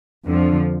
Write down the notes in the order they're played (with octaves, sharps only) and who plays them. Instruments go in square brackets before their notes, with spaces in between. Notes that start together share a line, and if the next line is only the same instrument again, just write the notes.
[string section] F2 D3 F3